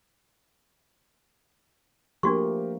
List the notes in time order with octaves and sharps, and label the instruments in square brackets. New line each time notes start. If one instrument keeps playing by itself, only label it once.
[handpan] F3 A3 A#3 [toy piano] D4 F#4 C#6 [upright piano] G4 A#4